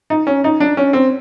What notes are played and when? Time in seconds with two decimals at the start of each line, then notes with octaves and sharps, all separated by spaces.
0.10 D#4
0.27 C#4
0.44 D#4
0.60 D4
0.77 C#4
0.93 C4